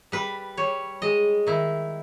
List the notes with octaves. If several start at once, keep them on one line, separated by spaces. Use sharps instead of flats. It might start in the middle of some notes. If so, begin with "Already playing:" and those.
G3 B4
G3 C#5
G#3 D#5
D#3 E4